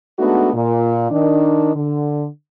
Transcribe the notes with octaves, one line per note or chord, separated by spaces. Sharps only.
G#3 A3 B3 D4 D#4 F#4
A#2
D#3 D4
D3